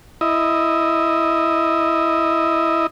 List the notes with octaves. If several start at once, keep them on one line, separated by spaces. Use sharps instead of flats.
E4 D#5